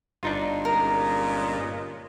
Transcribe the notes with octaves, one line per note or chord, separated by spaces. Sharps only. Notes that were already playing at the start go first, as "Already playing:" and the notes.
G1 G2 D4 D#4 F4
A#2 G#3 C#4 A#4